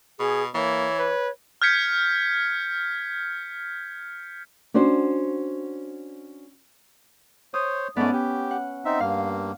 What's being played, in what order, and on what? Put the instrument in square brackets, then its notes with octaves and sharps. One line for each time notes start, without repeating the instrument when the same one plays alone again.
[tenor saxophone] B2 [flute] G#4
[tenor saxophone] E3 [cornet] A#3 [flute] C#5
[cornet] B4
[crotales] F6 G6 G#6 B6 C#7
[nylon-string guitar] C#4 D4 F#4 C5
[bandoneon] C5 C#5 [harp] D#6
[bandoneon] G#2 A3 D5 [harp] B3 C#4
[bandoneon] G4
[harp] F#5
[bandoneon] C4 D#4 E5
[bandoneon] G2 A#3 [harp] F5